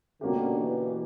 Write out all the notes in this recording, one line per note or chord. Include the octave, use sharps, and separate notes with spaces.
B2 D3 A#3 C#4 G4
E3